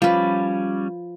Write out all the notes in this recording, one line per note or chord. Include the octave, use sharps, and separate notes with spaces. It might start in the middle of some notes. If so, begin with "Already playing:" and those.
F3 G3 C#4 B4 D5